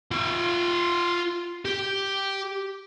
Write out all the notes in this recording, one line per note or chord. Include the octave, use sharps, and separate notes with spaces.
F4 E5
G4